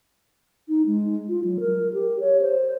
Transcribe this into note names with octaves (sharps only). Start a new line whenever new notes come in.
D#4
G#3
F4
F#3
A#4
G4
C#5
C5